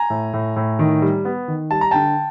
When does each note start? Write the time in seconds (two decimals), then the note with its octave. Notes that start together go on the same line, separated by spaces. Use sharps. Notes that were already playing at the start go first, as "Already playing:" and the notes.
Already playing: G#5 A#5
0.10 A2
0.33 A2
0.56 A2
0.79 D#3
1.02 G3
1.25 B3
1.48 D#3
1.71 G3 A5
1.81 A#5
1.91 D3 G5 A5